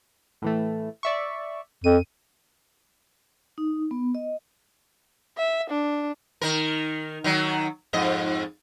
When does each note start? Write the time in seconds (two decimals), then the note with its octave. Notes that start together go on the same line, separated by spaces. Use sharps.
0.42 A2 E3 A3
1.03 D5 E5 C#6
1.84 F2 D#7
3.58 D#4
3.91 B3
4.15 D#5
5.38 E5
5.70 D4
6.41 D#3 A#4
7.24 D#3 F#3
7.93 F2 G#2 D#5